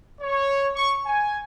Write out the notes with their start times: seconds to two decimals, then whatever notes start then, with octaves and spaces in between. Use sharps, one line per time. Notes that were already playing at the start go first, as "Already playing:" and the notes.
0.21 C#5
0.75 C#6
1.05 G#5